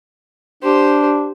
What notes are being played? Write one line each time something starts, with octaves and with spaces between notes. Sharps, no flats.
D4 G4 C5